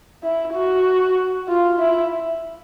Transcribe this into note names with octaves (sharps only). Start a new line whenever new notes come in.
E4
F#4
F4
E4